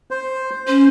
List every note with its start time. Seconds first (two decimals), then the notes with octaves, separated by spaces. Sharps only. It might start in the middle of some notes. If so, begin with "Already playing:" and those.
0.11 C5
0.67 C#4 C5